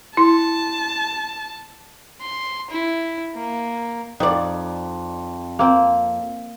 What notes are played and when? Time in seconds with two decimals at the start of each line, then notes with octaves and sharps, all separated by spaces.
0.17 E4 A5 C6
2.21 C6
2.70 E4
3.35 A#3
4.20 F2 D#4 D5
5.59 A#3 C4